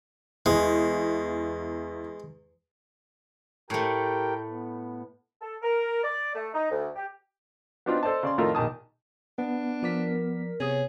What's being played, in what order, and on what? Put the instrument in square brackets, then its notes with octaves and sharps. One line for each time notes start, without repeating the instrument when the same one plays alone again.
[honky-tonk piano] E2 [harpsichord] G#3
[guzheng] A2 A3 [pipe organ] G4 A#4 G5
[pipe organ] B3
[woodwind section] A4
A#4
D5
A3
D#4
D2
G4
[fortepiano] B3 C4 D4 D#4 F4
A4 C5 D5 D#5 A5
C#3 D5 C6
F2 A2 D#3 A3 F4 A#4
A#1 D#3 A5 D#6
[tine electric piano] B3 [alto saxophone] D4
[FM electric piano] F3 D5 B6 [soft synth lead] A#4
[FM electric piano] C3 B3 D#6 [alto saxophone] G#4 [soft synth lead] C#5